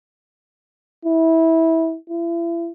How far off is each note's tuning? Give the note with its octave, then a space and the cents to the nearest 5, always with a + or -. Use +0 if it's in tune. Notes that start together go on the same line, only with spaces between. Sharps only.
E4 -20
E4 +40